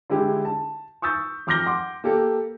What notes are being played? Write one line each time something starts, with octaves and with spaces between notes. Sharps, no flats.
D3 G#3 E4 G4
A5
C#6 D#6 E6 G6 A6
F2 D6 F6 G6 A#6 G7
F#5 C6 D6
A#3 G4 A4